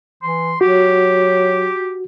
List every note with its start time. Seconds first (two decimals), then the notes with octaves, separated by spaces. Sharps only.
0.23 E3 C6
0.61 F#3 F#4 G4